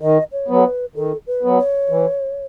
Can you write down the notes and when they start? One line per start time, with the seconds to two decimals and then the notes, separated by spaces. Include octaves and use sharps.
0.01 D#3 D#5
0.32 C#5
0.48 F#3 B3
0.56 A4
0.64 B4
0.95 D#3 A4
1.27 B4
1.43 F#3 B3
1.58 C#5
1.89 E3